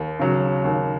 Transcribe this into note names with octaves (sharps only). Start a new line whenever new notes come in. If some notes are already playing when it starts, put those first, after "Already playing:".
Already playing: D#2
C#3 F#3
D#2